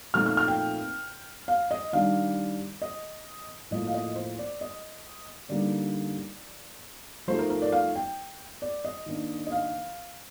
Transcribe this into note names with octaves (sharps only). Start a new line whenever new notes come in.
A#2 F3 A3 C4 D#4 F6
F6
F6
G5
F5
D#5
D#3 G3 D4 F5
D#5
A2 F3 A#3 D#5
F5
D#5
C5
D5
D#5
D3 G3 A#3 D#4 D5
F3 A3 D#4 C5
A#4
A#4
D5
F5
G5
D5
D#5
D#3 A#3 D4
D#5
F5